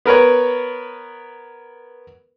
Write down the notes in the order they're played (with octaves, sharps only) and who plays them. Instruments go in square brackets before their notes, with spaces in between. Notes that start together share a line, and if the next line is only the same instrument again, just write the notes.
[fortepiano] B3 A#4 B4 C#5